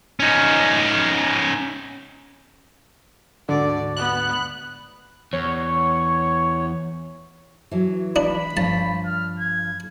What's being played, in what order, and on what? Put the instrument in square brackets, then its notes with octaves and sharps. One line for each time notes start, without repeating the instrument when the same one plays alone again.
[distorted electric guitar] C#4 D#4
[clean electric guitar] D2 G#2 F#4 [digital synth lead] D3 [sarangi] D5
[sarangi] B3 [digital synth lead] F#6
[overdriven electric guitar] E2 [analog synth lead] C#5 [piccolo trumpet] C#6
[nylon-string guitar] E3 F#3
[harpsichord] D4 [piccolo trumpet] B5
[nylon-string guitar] G2 F3 C#5 [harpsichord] A5
[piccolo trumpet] F6
G#6